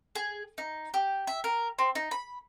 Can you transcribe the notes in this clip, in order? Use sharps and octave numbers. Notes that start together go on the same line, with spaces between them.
G#4
D#4
G4
E5
A#4
C4
D#4
B5